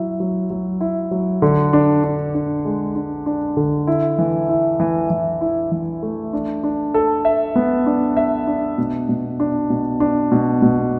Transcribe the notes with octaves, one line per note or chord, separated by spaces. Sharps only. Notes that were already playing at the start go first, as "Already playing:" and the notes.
Already playing: F#3 E4
F#3
F#3
E4
F#3
D3
D4
D4
D4
G#3
D4
D4
D3
E4
E3
E4
E3
E3
E4
E3
A3
D4
D4
A4
E5
B3
D4
E5
D4
B2
B2
D4
B2
D4
B2
B2